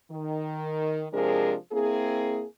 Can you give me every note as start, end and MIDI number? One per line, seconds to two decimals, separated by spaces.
0.11 1.07 51
1.13 1.55 48
1.13 1.55 53
1.13 1.55 56
1.13 1.55 62
1.13 1.55 68
1.13 1.55 70
1.72 2.44 58
1.72 2.44 60
1.72 2.44 64
1.72 2.44 68